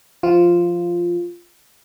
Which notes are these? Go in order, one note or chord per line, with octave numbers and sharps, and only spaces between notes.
F3 F4